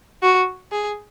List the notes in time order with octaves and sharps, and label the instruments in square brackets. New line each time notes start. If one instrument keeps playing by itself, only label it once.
[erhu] F#4
G#4